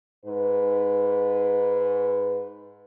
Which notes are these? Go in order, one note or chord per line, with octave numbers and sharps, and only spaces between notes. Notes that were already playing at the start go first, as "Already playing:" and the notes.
G#2 B4